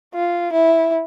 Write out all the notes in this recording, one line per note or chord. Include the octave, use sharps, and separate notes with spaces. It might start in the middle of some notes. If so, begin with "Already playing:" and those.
F4
E4